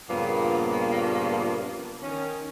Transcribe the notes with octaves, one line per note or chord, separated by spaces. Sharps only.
G2 A#2 C#3 F3 A#3 B3
D#3 C#4